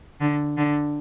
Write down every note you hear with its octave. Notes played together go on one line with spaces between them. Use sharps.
D3
D3